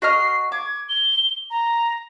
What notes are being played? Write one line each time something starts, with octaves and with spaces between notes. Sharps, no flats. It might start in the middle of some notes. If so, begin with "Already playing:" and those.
F#4 D#5 F6 C7
D6 G#6
G7
A#5